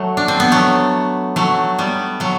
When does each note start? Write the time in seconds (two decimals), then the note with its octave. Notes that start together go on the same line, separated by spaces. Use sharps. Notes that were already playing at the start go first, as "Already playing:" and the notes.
Already playing: F#3 A3
0.17 D4
0.28 C4
0.40 B3
0.52 F#3 A3
1.36 F#3 A3
1.78 G3 B3
2.20 F#3 A3